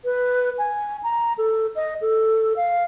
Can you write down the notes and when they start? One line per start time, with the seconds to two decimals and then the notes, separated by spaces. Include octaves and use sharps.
0.05 B4
0.58 G#5
1.03 A#5
1.38 A4
1.76 D#5
2.01 A4
2.57 F5